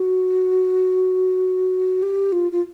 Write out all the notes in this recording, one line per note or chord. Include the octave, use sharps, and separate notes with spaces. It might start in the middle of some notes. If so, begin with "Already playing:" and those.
Already playing: F#4
G4
F4
F4